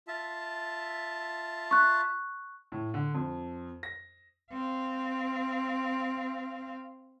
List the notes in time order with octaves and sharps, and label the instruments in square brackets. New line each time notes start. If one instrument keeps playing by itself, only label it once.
[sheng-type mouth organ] F4 E5 A5
[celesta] C#6 F#6
[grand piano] A2
D3
F2
A#6
[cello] C4 F5